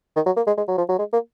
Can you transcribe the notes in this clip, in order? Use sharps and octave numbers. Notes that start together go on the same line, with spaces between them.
D#3
F#3
A#3
G#3
G#3
F#3
F3
F#3
G#3
A#3